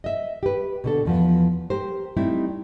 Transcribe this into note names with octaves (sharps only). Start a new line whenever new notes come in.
D#5 E5
G4 B4
B2 D3 A4
E2 F3 B3
G4 A#4 C5
G3 A3 C4 D#4 E4